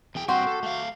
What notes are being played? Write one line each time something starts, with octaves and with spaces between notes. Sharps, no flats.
E2 G#4 G5
G2 C4 F#4 G4 G5 C6
A4
A3 F5